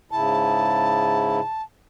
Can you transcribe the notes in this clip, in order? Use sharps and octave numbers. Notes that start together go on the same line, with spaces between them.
G#2 C#3 E4 A5